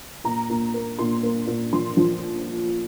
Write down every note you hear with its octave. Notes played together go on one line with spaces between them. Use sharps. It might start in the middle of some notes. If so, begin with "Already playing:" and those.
A#2 A#5
A#2
A#3
A#2 C6
A#3
A#2
F3 C6
F3